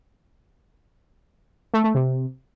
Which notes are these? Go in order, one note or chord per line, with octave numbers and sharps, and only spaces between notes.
A3
A3
C3